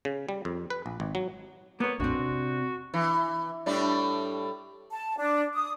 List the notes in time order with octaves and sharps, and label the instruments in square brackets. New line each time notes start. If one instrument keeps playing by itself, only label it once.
[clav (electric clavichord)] C#3
G3
F2
B4
A#1
G#1
F#3
[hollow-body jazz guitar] A#3 C#5 [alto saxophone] B3
[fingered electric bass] A#1 F2 A2 [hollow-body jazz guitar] C4 D4 [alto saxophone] F#4
[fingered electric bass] C3
[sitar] E3
A2 G3 D4
[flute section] A5
D4
D#6